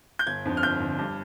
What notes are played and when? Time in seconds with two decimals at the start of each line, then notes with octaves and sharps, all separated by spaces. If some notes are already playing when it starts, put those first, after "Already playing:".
0.19 G6
0.27 G1 G#6
0.45 F2 D3
0.57 F6
0.63 G1 G6
0.80 F2 D3
0.98 G2